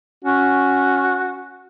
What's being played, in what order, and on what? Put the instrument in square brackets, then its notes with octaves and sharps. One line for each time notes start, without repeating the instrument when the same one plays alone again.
[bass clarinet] C#4 [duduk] F#4